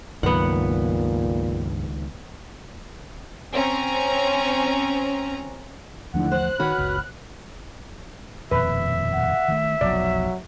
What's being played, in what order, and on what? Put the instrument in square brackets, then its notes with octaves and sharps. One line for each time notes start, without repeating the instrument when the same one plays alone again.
[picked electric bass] C#2 D#3 [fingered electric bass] G2 F#3 [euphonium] A#2 [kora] B3 F#5
[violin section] C4 C#4 A#5
[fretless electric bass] D#2 F3 A3 [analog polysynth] G#2 D3 E3 [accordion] F#5
[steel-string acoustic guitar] C5 [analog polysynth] F#6
[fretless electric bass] D#3 [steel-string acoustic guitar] F#4 B4 C#5 [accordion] B5 F6
[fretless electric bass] F#1 C#2
[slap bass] D#1 F2 B2 [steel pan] B4 [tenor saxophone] E5
[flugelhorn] F#5
[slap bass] D#3 G3 A3
[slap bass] F1 B1 C3 [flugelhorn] F#3 [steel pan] D5